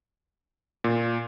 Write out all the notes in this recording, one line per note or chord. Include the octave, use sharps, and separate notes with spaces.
A#2